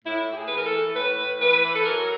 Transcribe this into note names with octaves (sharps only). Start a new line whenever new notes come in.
A2 E4
A2 G4
G#4
E3 B4
A#4
A4
E3
A2 B4
A2
E3 B4
E3
A4
F#3 A#4